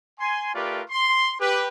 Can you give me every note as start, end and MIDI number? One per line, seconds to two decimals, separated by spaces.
0.19 0.53 80
0.19 0.53 84
0.53 0.81 57
0.53 0.81 65
0.53 0.81 67
0.53 0.81 70
0.53 0.81 71
0.53 0.81 74
0.89 1.33 84
1.40 1.68 67
1.40 1.68 71